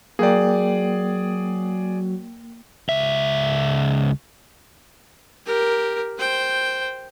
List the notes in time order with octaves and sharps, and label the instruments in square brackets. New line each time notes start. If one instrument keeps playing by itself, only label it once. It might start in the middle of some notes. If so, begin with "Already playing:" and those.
[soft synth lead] F#3 [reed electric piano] A#3 G5 [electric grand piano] G#4 D5
[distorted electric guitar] C#2 E5
[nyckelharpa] G4 A#4
C5 G5